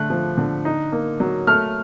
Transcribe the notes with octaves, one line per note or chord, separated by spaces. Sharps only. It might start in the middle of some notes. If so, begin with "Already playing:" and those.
Already playing: D3 A3 F#6
F3
D3
D#4
A#3
F#3
A3 F6